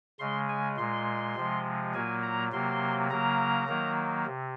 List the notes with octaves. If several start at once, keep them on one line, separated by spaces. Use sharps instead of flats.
C#3 G#3 C6
G#5
A#2 G#3 C6
C3 F3 G#3
A#2 F#3 A#3 G#5
A#5
C3 F#3 A#3 C6
C#3 F#3 A#3 A#5
D#3 F#3 A#3
C3